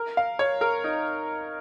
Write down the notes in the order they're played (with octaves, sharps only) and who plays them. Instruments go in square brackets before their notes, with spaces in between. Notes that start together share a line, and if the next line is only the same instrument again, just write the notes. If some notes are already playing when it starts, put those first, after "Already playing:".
Already playing: [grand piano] A#4
F5
C#5
A#4
D#4